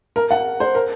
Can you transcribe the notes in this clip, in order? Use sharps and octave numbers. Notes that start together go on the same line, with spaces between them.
A#4
F#5
C5
A#4